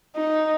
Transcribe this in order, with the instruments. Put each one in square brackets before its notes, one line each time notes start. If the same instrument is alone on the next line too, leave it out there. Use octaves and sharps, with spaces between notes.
[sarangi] D#4